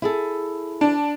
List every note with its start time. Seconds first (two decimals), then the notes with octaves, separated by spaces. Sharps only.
0.02 E4 G#4 A4
0.81 D4